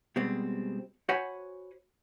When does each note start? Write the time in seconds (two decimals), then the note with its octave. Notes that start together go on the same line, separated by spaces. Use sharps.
0.16 B2 G3 G#3 C4
1.09 F#4 C5 C#5 F#5 G#5 B5